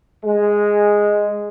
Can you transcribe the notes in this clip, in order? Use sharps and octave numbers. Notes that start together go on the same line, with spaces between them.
G#3